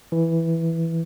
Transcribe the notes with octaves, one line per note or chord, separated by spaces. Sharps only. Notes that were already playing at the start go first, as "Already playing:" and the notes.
E3